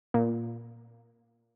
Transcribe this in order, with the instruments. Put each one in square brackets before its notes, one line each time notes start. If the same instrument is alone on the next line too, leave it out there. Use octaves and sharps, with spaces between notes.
[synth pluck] A#2